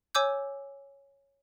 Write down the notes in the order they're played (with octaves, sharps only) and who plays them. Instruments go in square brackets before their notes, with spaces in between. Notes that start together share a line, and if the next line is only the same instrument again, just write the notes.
[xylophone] C#5 G#5 D6 E6 G6